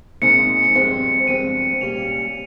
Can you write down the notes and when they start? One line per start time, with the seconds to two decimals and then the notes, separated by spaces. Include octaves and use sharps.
0.22 A#2 G#3 C4 D#4 C#7
0.75 G2 F3 G#3 C4
1.27 G2 F3 G#3 C4 D#7
1.81 A#2 G3 C#4 F7